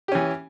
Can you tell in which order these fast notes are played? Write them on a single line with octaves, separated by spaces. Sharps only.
G4 C#4 E3